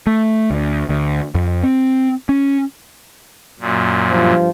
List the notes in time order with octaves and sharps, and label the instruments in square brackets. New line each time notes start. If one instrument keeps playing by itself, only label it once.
[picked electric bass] A3
D2
D2
F2
C4
C#4
[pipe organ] F#2 A#2
[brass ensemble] G2 F3